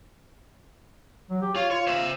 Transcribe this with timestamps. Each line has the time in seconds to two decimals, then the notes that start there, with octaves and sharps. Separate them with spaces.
1.30 F#3
1.42 G4
1.56 F4 C#5
1.71 F4 C#5
1.87 C5 E5